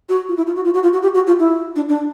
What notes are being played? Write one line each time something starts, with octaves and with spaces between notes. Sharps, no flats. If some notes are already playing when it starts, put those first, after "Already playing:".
F#4
F4
E4
F4
F#4
F4
F#4
F4
F#4
G4
F#4
F4
E4
D4
D4